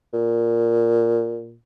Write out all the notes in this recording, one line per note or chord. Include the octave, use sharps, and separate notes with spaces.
A#2